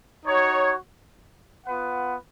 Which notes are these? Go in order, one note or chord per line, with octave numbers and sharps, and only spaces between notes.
D#4 F#4 C#5
B3 F4 B4 F#5